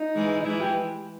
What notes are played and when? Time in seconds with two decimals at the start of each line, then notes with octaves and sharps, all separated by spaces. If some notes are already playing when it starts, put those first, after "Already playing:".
Already playing: D#4
0.15 E3 G#3
0.41 D#4
0.45 E3 G#3 E4
0.60 G4